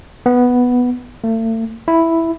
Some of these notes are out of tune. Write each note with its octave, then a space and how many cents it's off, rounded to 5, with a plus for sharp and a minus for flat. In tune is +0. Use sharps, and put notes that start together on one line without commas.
B3 +0
A3 +40
E4 +0